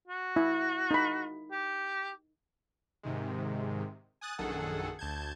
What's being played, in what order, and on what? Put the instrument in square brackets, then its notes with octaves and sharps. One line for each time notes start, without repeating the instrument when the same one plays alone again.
[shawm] F#4
[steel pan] E4
D#4 B5
[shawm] G4
[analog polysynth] G#2 C3 D#3 G#3
G#5 D#6 F#6 A6
A#1 F#2 D#3 G#4 A4 F#5
D2 A5 G6 G#6